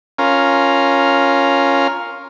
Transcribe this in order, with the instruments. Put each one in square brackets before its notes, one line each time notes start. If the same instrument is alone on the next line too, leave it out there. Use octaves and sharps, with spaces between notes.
[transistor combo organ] C#4 F4 A#4